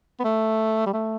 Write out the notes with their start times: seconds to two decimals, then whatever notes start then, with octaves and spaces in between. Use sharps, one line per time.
0.20 B3
0.24 A3
0.86 G3
0.93 A3